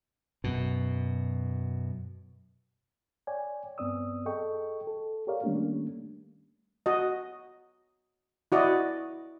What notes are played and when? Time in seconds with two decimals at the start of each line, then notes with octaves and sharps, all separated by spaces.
0.44 F#2 B2
3.27 C#5 D5 G5 G#5
3.78 G2 B3 C4 D5 D#6 E6
4.26 G#4 A4 D#5 G5 C#6
4.87 A4
5.27 G4 G#4 A#4 C#5 D5 F5
5.43 D#3 G3 A3 A#3 C#4 D4
6.86 F#4 D#5
8.52 E4 F#4 D5 D#5